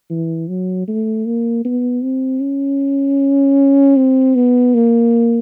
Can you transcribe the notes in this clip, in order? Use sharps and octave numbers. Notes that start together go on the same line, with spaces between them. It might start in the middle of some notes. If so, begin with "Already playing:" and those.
E3
F#3
A3
A#3
B3
C4
C#4
C4
B3
A#3